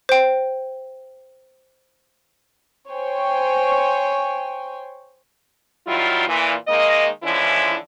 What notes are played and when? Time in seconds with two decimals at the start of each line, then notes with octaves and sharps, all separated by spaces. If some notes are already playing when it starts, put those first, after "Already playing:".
0.09 C5 G5
2.90 C5 C#5 G5 G#5
5.86 D#3 F#3 G3 E4 F4
6.28 A#2 E3
6.67 D#3 G#3 A#3 D#5
7.22 D3 E3 F3 G#3 C#4 E4